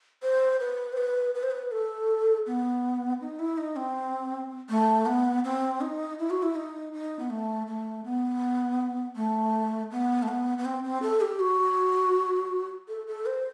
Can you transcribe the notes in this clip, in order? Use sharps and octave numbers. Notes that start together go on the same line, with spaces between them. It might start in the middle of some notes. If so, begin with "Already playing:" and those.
C5
B4
C5
B4
B4
C5
B4
A4
B3
D#4
E4
D#4
C4
A3
B3
C4
D#4
E4
F#4
E4
D#4
D#4
B3
A3
A3
B3
A3
B3
A3
B3
B3
C4
C4
A4
G4
F#4
A4
A4
C5